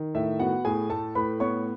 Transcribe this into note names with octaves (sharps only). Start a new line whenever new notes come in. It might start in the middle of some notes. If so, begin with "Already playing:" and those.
Already playing: D#3
A2 E5
B3 F#4 F#5
A2 G#4 G#5
A3 A4 A5
A2 B4 B5
B3 C#5 C#6